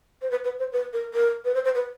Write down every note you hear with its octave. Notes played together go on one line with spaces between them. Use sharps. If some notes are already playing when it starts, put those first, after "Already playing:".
C5
B4
B4
C5
B4
A#4
A#4
B4
C5
C5
B4